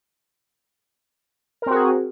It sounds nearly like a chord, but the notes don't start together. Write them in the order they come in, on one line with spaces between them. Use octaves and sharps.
A#4 C4 F#4 G#4